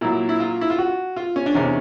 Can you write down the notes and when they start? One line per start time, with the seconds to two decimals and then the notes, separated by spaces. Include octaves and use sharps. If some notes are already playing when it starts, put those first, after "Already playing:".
0.01 A#2 F#3 E4
0.29 E4
0.40 F4
0.61 E4
0.70 F4
0.78 F#4
1.16 F4
1.36 C#4
1.46 D4
1.54 E2 C3 D#3 C#4